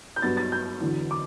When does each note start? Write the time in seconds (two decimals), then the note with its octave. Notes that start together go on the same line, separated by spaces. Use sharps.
0.16 G6
0.22 G2 F#3 B3 A6
0.37 A6
0.52 G6
0.81 E2 D3 F#3
1.11 D6